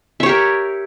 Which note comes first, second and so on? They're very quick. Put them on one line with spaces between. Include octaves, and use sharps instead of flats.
E5 C#5 G4 A#4